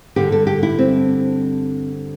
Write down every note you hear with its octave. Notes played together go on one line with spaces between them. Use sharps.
G2 D3 G3 G4
A4
G4
E4
C4